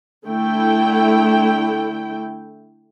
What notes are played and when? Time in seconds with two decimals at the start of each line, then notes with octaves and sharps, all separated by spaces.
0.26 D3 A3 E4 G5